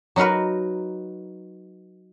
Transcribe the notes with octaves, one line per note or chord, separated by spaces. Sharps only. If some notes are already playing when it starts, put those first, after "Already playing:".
F#3 D#4 F#4 A#4 B4